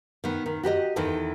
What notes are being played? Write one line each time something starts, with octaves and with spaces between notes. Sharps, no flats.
D#3 B3
D#3
F#4 G4 B4 D#5
E2 D#3 E3 A4